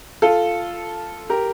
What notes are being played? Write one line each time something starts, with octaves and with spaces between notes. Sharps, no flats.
F4 A4
G4 A#4